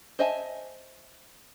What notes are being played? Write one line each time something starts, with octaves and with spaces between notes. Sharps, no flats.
C5 D#5 E5 G#5 A5